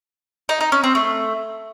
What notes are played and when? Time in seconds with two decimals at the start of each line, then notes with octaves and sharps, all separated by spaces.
0.49 D#4
0.61 D#4
0.72 C#4
0.84 C4
0.95 A3